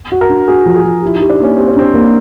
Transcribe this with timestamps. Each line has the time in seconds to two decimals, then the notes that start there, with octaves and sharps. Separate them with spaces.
0.12 F#4
0.21 A#4
0.29 D4
0.48 F#4 G#4
0.66 F3
0.76 G#4
0.84 F3
1.02 E4 G4
1.16 D#4
1.21 G4
1.30 D4
1.39 A#3 C#4
1.57 C4 G4
1.68 C#4
1.76 C4 D4
1.94 A#3